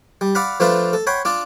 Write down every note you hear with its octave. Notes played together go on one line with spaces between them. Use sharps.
G3
D5 F5 F#5 B5
F3 A3 D4 F4 B4 F5
A4
C#5 F#5 G5 B5 C6
D4 F4 D5